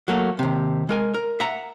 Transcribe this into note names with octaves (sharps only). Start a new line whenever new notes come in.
F#3 A3 A#3
D#2 C3
G#3 A#4 G#5
A#4
E5 F#5 A#5